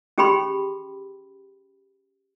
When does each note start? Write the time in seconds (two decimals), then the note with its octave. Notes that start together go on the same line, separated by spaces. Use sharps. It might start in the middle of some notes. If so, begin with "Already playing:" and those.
0.18 C#4 G4 G#4 G5 B5 C6